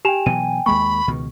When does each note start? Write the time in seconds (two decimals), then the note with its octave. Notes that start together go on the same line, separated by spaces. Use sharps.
0.05 G4 G5 G#5 E7 F7
0.26 B2 E3 F#3 D#7
0.66 D#2 G#3 A#3 B5 C#6
1.08 C#2 B2 D#3